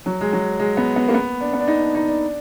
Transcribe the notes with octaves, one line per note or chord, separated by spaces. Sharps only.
F#3
G#3
F#3
G#3
B3
B3
A#3
B3
D4
B3
D4
D#4
D4
D#4
D4